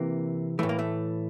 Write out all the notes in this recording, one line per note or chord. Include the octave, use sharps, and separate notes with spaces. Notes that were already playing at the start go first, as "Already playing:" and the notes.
Already playing: C3 E3 A#3
A2 E3 A3
A#3
A3